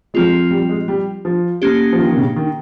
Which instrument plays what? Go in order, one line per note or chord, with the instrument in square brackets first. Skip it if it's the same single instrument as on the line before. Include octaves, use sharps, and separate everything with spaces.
[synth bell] F3 C4 F4 [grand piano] G#3
[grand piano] G3
G#3
G3
F3
[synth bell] A#3 C#4 G4
[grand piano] F3
D#3
D#3
C#3
D#3